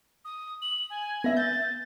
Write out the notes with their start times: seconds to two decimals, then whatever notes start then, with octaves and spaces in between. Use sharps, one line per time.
0.25 D#6
0.62 F#7
0.90 G#5
1.24 B3 E5 A#6
1.37 G6 A6